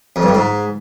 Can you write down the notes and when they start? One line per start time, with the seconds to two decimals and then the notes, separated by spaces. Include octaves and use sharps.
0.16 F2
0.22 G2
0.28 F2
0.34 G#2